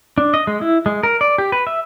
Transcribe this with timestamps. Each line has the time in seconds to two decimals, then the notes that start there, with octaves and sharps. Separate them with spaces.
0.18 D4
0.34 D#5
0.47 G#3
0.61 E4
0.86 G#3
1.03 A#4
1.21 D5
1.38 G4
1.52 B4
1.67 E5